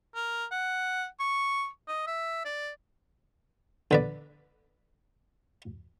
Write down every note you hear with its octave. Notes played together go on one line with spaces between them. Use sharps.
A#4
F#5
C#6
D#5
E5
D5
D3 B4 D5